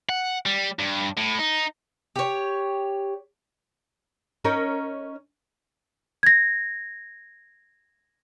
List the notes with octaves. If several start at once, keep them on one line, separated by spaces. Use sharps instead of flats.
F#5
G3
G2
A2
D#4
G4 C#5
C#4 D#4 A#4
G#6 A#6